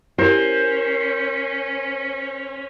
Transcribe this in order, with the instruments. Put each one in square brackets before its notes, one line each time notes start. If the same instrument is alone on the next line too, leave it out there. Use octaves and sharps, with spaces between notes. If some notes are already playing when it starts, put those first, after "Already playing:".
[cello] C#4 [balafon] E4 G4 [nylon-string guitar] A#4 [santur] C5